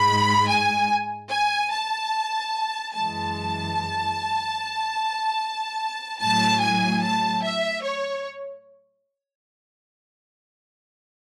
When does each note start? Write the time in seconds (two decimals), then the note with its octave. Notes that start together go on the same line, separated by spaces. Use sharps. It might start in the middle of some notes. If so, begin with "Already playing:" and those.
Already playing: G#2 G#3 B5
0.49 G#5
1.30 G#5
1.72 A5
2.94 F#2 E3 G#3 A5
6.20 A2 F#3 A5
6.61 G#5
7.03 A5
7.43 E5
7.84 C#5